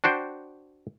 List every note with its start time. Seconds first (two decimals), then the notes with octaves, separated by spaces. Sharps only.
0.04 D4 F#4 C5 G5